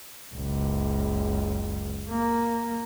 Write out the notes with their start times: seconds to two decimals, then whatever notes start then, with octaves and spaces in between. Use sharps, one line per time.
0.34 F#1 C#2
2.10 A#3